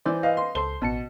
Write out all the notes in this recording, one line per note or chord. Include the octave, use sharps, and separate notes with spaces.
E3 C5 D5 G6
B4 D#5 F5
C6
C#2 A4 C5 C6 G7
A1 B2 A5 C#7